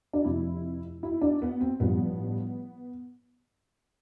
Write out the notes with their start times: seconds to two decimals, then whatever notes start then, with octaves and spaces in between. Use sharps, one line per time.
0.13 D4
0.24 F1 F2 C3 F3 E4
1.03 E4
1.21 D4
1.42 B3
1.61 C4
1.80 A1 G2 F3 B3